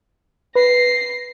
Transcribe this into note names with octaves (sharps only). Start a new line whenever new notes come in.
B4 A#6 C7